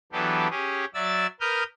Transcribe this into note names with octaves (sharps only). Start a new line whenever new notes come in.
E3 F#3 B3 D4 G4 A4
C#4 G4 G#4
F#3 D5 E5 E6 A6
A#4 B4 D#6 F6 G6